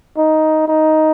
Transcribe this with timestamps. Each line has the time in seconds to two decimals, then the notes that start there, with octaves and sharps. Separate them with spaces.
0.18 D#4
0.68 D#4